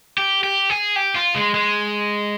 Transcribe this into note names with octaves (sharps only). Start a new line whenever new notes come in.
G4
G4
G#4
G4
F4
G#3
G#3